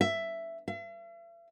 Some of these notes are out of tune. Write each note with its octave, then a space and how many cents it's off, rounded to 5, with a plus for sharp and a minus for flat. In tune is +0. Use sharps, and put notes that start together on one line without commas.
E5 +10
E5 +45